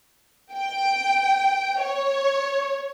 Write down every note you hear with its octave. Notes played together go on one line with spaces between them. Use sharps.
G5
C#5